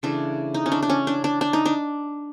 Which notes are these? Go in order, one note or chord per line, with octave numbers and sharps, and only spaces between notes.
C#3 E3 A3 D4
D#4
C#4
D4
D4
C#4
D4
D4
D4
D#4
D4